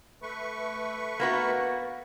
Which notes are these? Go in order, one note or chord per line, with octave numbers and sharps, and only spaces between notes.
A3 B4 C#6
A#3 B3 F#4